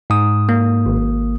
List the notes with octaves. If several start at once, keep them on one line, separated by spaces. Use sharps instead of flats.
G#2 D#6
A#3
G#1